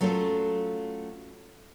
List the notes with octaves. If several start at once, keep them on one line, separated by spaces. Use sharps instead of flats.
F#3 A3 C#4 F4 A4